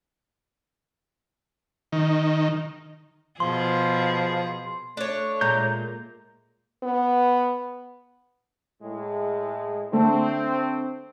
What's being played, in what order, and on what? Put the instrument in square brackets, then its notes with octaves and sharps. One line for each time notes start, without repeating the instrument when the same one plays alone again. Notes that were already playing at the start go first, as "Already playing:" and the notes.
[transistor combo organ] D#3
[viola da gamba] B2 G#4 [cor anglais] F3 [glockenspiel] C6
[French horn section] A3 [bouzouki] D4 C#5
[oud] A#2 G#3 [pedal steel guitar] A#5 G6
[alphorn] B3
[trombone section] A2 G#3
[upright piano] D3 A3 [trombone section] C4